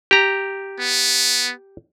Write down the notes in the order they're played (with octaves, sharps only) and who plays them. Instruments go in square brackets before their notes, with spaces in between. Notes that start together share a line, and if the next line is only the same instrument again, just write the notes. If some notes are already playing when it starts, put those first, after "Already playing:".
[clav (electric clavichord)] G4 A#5
[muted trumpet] B3